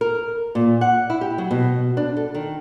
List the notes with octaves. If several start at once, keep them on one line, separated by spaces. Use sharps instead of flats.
A#4
A#2
F#5
E4
G4
F#3
B2
D4
A4
D#3